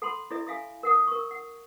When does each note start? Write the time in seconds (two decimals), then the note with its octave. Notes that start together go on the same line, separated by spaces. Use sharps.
0.02 A4 F#5 A5 B5 C6
0.31 E4 A4 D5 E5
0.47 A4 E5 F5 G#5
0.83 A#4 F#5 D#6
1.07 A#4 C#6
1.31 F#5